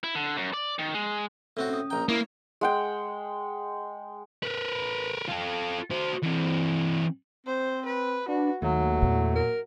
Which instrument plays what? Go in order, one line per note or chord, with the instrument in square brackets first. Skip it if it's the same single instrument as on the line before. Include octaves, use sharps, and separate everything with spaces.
[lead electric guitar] E4
D3
F#2
D5
D#3
G#3
[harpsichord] A2 C4 F#4
[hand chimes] C#4 D#6
[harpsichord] A#1 G5 [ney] A#5
[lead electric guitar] A#3 [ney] E4 [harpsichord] C#5
[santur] G#3 F#5 G5
[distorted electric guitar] A#4 B4
F4 A4
F#4 C5
E3 C4
[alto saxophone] C4 [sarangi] C5
[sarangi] B4
[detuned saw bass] D4 [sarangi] F#4 [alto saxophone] B4
[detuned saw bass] D#2 [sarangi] F#3 [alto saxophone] A3
[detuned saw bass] E2 [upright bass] A#2
[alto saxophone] A#4